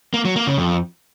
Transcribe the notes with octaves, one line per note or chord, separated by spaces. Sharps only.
A#3
F#3
A#3
C#3
F2